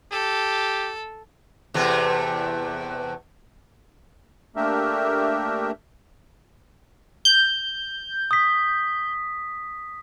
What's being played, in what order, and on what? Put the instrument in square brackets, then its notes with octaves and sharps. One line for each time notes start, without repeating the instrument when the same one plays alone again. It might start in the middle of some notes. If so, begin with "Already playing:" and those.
[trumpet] G4 [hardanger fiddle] A4
[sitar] E2 C3 A3
[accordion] A3 A#3 D4 G4 A#4 E5
[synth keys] G6
[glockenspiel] D#6 B6